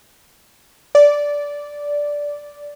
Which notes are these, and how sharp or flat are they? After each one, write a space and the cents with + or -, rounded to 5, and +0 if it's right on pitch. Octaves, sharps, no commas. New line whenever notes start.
D5 -10